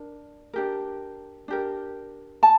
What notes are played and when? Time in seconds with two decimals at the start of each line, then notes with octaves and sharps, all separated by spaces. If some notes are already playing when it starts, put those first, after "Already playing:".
Already playing: D4 A#4
0.54 D4 G4 A#4
1.48 D4 G4 A#4
2.43 A5